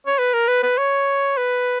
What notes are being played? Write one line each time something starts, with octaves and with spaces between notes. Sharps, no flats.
C#5
B4
A#4
B4
B4
C#5
B4